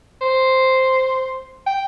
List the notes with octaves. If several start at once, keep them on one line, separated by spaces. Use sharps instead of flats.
C5
G5